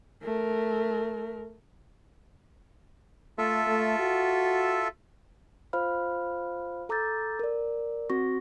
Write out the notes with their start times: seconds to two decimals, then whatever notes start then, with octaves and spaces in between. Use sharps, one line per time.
0.23 A3 A#4
3.38 A3 F4 A4 E5
3.67 A3
4.00 F#4
5.73 F4 C5 F5 B5 F6
6.89 A4 A#5 D6 E6 G6 A6
7.39 A#4 D5
8.10 C4 F#4 C#6 A#6